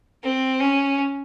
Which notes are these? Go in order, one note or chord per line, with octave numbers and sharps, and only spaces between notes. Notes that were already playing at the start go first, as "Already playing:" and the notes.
C4
C#4